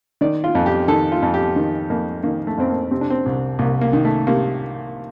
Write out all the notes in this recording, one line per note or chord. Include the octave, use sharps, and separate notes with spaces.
D#3 D5
F4
F2
G4
D#3 A4
F4
F2
G4
D#3
F2 A#3
D#3 A#3
A3
F2 C4
A#3
C3 C4
D4
C4
C2
C2 A#3
A#3
D#3
A3
C3 A#3